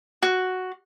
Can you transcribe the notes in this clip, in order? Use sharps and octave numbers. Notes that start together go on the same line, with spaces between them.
F#4